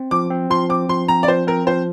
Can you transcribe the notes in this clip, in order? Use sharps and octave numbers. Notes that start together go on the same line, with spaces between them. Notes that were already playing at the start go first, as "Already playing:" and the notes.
Already playing: C4
F3 D6
C4
F3 C6
C4 D6
F3 C6
C4 A#5
D5
F3 C5
C4 A#4
F3 C5